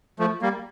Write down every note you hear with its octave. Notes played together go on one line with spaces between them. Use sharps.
F3 A3
G3 A#3